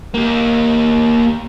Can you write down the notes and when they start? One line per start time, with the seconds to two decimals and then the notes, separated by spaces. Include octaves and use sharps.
0.14 A#3 G4